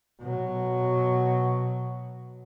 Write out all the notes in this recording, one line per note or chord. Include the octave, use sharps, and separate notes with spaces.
B2 F#3